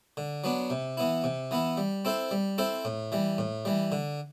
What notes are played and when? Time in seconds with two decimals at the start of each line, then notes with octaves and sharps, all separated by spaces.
0.17 D3
0.44 F#3 B3 D4
0.70 C3
0.97 E3 B3 E4
1.24 C3
1.51 E3 B3 E4
1.77 G3
2.05 C4 E4 A4 C5
2.31 G3
2.58 C4 E4 A4 C5
2.85 A2
3.12 E3 G3
3.38 A2
3.65 E3 G3
3.92 D3